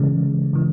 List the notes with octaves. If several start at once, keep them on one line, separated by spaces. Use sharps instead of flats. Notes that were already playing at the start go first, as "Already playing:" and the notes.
Already playing: C#3 E3 G#3
C#3 E3